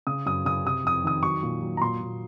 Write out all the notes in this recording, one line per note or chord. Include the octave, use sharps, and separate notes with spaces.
C#3 D#6
F#2 D#6
C#3 D#6
C3 D#6
F2 D#6
D#3 D#6
F#3 C#6
A#2
F#3
A#5
A#2 C6
A#2